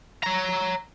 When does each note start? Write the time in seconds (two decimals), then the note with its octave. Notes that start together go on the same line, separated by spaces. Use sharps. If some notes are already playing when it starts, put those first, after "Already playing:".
0.23 C#5 A#5